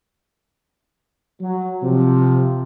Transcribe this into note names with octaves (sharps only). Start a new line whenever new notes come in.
F#3
C3 F3